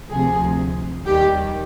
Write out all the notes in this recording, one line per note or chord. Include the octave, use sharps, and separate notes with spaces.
D2 C3 F3 G#4
D#2 D#3 G3 G4